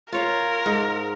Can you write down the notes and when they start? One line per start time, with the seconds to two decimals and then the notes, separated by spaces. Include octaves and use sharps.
0.12 F4 A#4 C#5 F5
0.66 G#2